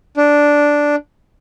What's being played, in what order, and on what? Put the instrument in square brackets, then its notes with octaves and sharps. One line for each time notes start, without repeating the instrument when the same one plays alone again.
[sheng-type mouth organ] D4